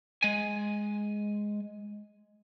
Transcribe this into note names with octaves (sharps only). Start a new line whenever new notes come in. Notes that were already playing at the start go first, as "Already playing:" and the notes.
G#3 G#5